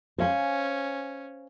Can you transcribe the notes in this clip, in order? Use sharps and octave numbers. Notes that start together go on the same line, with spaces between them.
C#4 C5 F5 G#5